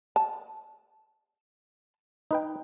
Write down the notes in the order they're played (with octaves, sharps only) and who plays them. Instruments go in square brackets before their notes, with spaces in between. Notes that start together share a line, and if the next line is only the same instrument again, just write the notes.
[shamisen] A5
[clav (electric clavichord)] D#4 B4 G5